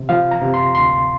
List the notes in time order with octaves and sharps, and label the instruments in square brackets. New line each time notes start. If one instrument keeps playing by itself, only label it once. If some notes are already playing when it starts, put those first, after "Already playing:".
Already playing: [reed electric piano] C3
F3 F5
A#5
C3
C6
D2 C6